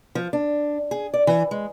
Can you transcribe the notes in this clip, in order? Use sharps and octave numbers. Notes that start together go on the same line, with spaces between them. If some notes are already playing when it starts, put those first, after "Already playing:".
F3
D4
G#4
D5
E3
G#3